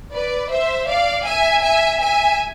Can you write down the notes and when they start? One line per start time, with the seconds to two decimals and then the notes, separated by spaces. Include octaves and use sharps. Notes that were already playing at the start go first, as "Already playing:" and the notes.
0.12 B4 D5
0.49 C5 E5
0.88 D5 F5
1.25 E5 G#5
1.62 E5 G#5
2.01 E5 G#5